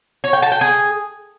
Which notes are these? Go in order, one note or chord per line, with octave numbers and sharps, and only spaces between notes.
C#5
G5
A5
G5
G#4